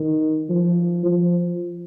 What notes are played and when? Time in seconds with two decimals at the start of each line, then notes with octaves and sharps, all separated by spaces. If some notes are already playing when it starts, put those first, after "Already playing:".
Already playing: D#3
0.50 F3
1.05 F3